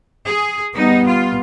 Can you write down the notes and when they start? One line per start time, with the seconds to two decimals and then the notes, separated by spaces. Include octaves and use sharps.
0.28 G#4
0.76 G3 B3 D#4
1.06 F4